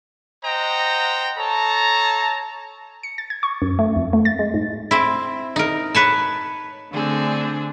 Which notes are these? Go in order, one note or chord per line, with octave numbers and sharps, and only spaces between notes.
C5 D#5 F#5 G5 A#5
A4 C#5 A5 A#5
C#7
A6
G#6
C#6
F#2
A3
F2
A3
A6
G#3
G#2
C4 E4
D#4 A#4
B4 C#5 A5
D3 A3 C4 D4 G#4